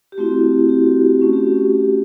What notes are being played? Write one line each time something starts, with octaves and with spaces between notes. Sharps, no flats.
G4
A3 C4 E4 F#4
G4
F#4
G4
A3 C#4 F#4
G4
F#4
G4